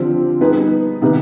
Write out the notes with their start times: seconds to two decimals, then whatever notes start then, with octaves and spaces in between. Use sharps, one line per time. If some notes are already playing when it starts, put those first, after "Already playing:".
Already playing: D3 F3 C4 G4 C5
0.40 G3 B3 D#4 G#4 B4
1.01 C3 D#3 B3 D#4